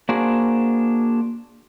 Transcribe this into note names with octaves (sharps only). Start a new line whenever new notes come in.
A#3 D4 F#4 G#4 C5